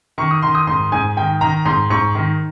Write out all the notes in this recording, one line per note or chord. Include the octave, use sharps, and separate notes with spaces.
D#3 C#6
D#6
D#3 C6
D#6
G#2 C6
G#2 G#5
D#3 G5
D#3 A#5
G#2 C6
G#2 C#6
D#3